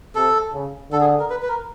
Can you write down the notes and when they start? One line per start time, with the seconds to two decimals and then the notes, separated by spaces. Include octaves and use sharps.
0.15 C3 A4
0.54 C#3
0.91 D3 A4
1.01 G#4
1.20 A#4
1.30 B4
1.42 B4
1.48 A#4